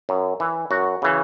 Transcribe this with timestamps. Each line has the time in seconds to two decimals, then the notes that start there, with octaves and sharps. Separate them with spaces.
0.09 F#2
0.40 E3
0.71 F#2 F#4
1.02 C#3 E3